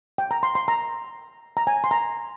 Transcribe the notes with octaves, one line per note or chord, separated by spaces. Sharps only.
G5
A#5
C6
C6
A#5
A#5
G#5
C6
A#5